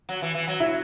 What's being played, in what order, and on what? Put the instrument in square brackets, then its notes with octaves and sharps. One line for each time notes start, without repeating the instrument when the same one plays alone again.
[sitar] F#3
E3
E3
F#3
[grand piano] E4